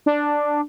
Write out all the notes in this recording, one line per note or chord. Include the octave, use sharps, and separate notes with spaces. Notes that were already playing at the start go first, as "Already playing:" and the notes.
D4